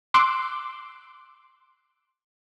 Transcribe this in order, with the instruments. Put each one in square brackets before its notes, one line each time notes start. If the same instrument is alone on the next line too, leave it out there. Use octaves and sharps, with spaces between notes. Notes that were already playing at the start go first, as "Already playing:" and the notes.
[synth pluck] C6 D6 E6 F#6